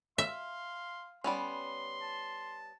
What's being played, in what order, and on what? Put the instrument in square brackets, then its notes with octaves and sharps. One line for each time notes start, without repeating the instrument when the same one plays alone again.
[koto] E5 [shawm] F5 [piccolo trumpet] C6
[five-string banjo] G3 B3 C#4 [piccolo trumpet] C6
[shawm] A5